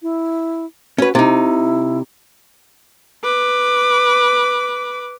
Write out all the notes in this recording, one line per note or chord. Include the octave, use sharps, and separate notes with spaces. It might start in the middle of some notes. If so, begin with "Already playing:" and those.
E4
C#4 F#4 B4
C3 D#4 E4
B4 D6